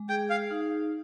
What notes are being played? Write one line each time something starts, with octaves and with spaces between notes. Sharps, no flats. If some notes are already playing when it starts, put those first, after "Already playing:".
Already playing: G#3
G#4 G5
F5
D#4